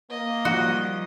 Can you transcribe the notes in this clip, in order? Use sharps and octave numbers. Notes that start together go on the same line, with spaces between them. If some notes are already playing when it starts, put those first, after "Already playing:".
A#3 D#5
D#3 F3 G3 F#4